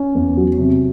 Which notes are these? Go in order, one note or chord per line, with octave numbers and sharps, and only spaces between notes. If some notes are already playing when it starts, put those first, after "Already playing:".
Already playing: C#4
E2
F#3
C3